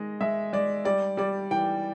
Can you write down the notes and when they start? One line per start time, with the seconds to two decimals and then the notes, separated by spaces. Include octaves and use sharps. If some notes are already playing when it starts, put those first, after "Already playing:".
Already playing: D#3 G#3 D#5
0.21 G#3 E5
0.53 G#3 D5
0.85 G3 D5
1.17 G3 D5
1.51 E3 G5